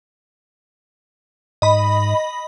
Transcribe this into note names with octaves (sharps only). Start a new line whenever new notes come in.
G#2 D#5 B5